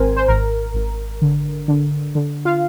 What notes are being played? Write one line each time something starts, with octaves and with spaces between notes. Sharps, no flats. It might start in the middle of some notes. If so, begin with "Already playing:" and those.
Already playing: G#1 C4 A#4 C5 G#5
C5
G#1 A#4
G#1
D3
D3
D3
F4 F5